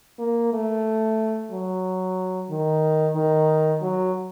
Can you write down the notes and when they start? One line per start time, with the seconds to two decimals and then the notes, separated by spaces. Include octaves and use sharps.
0.19 A#3
0.53 A3
1.52 F#3
2.50 D#3
3.16 D#3
3.82 F#3